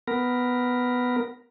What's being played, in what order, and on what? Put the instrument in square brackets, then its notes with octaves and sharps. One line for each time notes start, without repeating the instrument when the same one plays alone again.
[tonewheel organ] B3 A#4